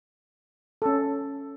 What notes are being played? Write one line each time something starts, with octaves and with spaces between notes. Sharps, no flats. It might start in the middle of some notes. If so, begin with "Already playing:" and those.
C#4 A4